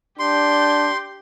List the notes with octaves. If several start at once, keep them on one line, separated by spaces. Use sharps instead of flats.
D4 G4 C6 G6